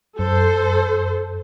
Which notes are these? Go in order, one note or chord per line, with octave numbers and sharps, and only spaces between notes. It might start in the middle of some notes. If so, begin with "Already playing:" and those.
F#2 A4 C5